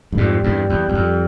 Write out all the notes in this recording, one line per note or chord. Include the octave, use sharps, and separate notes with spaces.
G2
F2 G#2 G3
E2 G2
E2
E2
F2